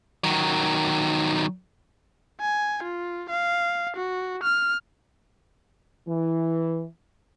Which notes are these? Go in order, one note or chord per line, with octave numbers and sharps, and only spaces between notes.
D#3 F#3
G#5
F4
F5
F#4
F6
E3